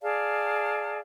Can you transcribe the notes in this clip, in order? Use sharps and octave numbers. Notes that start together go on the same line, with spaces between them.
G#4 D5 F5 A5